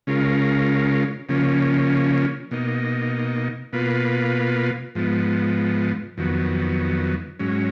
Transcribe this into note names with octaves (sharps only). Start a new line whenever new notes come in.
C#3 G#3 C#4 F4 A#4
C#3 F3 A#3 C#4
B2 A#3 D#4
B2 A#3 F4 B4
G#2 F3 B3
F2 D#3 F#3 B3
G#2 F#3 C#4